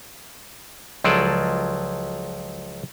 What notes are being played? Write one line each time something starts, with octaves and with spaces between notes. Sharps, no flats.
C#2 F3 F#3 G#4 A4 D5